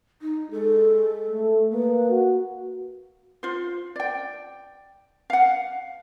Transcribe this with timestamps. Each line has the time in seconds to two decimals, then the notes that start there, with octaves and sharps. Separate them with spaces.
0.21 D#4
0.51 G#3 A4
1.30 A3
1.72 A#3 B4
2.10 F#4
3.43 F4 C5
3.96 D5 G5
5.30 F5 F#5